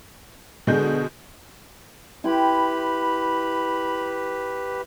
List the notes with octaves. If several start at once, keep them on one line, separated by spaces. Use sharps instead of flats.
B2 D3 G#3 G#4 G6
E4 G4 B4 G5 B5 C6